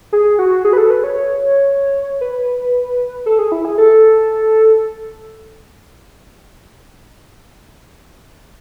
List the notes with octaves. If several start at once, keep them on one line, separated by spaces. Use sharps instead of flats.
G#4
F#4
G#4
B4
A4
B4
C#5
B4
A4
G#4
E4
G#4
A4